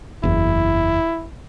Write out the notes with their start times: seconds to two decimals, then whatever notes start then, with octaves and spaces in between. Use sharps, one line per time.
0.23 F#1 E2 E4